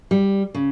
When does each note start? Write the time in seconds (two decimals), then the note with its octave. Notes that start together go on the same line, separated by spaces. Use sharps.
0.11 G3
0.54 C#3